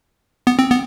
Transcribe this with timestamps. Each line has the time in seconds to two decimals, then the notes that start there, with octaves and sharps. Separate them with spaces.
0.47 B3
0.59 C4
0.70 B3